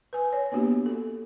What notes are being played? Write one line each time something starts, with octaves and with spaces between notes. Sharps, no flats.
B4 G#5
C#5
A#3 B3 D4 F#4 G4
A4